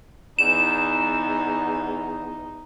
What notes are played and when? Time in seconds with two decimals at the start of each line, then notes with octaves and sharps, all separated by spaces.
0.39 E2 D#4 E7